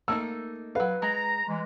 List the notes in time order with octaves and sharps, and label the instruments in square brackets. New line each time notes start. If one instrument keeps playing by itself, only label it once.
[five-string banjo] A3 A#3 D#4 [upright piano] E6
[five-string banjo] F#3 F5 [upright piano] B4
[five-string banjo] G#3 [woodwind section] A#5
[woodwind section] E3 G#3